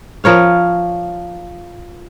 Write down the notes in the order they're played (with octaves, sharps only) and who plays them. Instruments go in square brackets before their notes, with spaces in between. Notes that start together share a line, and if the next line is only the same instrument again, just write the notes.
[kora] F3 A#4 C#5 F5